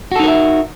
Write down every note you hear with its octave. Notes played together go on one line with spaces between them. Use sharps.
D#4 F#4 A4 A#4 E5